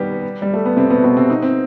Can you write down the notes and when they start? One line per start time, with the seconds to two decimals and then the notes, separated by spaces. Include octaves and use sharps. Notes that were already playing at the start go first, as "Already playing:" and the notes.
Already playing: B2 D#3 G3 B3 G4
0.42 G3
0.54 A3
0.65 B3
0.77 C3 C4
0.90 B2 B3
1.04 B2 B3
1.17 C3 C4
1.30 D#4
1.43 C4